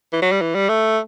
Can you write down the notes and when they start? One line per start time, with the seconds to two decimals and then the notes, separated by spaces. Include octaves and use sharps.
0.13 E3
0.22 F#3
0.32 G3
0.41 E3
0.55 G3
0.69 A3